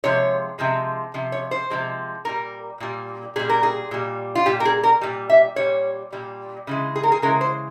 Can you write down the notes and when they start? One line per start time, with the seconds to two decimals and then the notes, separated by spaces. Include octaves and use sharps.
0.04 C3 F3 G#3 C#5
0.59 C3 F3 G#3
1.14 C3 F3
1.32 C#5
1.51 C5
1.70 C3 F3 G#3
2.25 A#2 G3 A#4
2.80 A#2 G3
3.36 A#2 G3 G#4
3.49 A#4
3.63 G#4
3.91 A#2 G3
4.35 F4
4.46 A#2 G3 G4
4.60 A#4
4.65 G#4
4.83 A#4
5.01 A#2 G3
5.30 E5
5.56 A#2 G3 C#5
6.13 A#2 G3
6.67 C#3 E3 G#3
6.96 G#4
7.03 A#4
7.12 G#4
7.22 C#3 E3 G#3 A#4
7.41 C5